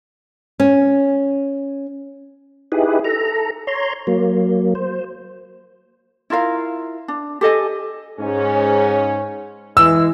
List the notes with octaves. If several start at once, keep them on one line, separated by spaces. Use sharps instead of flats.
C#4
D#4 E4 G4 G#4 B4
A4 A#5
C#5 A#5 C6
F#3 A#3
C5
E4 F4 A#4 F5
D4
G4 A4 D#5 G#5
G#2 C#4
E3 G#3 E6